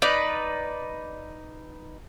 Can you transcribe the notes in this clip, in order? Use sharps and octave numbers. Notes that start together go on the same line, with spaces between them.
D#4 B4 D5